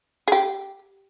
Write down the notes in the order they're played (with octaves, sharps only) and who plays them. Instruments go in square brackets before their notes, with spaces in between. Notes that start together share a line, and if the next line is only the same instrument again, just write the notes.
[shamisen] G#4
G4